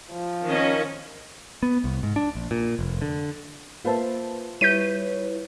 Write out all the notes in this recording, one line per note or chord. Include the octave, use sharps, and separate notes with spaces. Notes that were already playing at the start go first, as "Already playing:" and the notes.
F3
D#3 C#4 D#5
B3
C2
G#2
D4
A#1
A#2
F1
D3
A#3 F4 B4 C5 E5 A5
G3 E4 B4 C#5 G6 B6 D#7